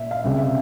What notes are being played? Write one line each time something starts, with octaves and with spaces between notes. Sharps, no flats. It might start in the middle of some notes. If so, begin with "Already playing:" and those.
Already playing: A#2 E5
F5
C#2 C3 G3 E5
E5